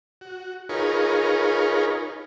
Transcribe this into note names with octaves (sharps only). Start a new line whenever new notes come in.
F#4
D#4 F4 G#4 A#4 B4 C#5